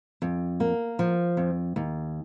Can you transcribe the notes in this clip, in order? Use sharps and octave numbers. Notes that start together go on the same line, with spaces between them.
F2
A#3
F3
F2
D#2